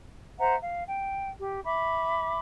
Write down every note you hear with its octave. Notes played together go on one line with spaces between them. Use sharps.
C5 E5 F#5 A#5
F5
G5
G4
E5 B5 C#6 D6